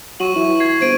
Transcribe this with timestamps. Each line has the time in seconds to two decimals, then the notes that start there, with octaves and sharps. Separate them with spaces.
0.20 F#3 C#6 D#7 F#7
0.36 E3
0.60 G#6 C7
0.81 G1 C5 G#6 D7 D#7